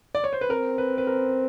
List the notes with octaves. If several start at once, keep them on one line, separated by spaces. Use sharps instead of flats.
D5
C#5
C5
B4
C4 A#4
B4
B4
A#4